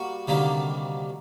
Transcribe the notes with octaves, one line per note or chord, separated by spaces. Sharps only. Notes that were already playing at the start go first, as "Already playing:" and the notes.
Already playing: G3 A#3 F#4
D2 C3 D#3 G3 A#3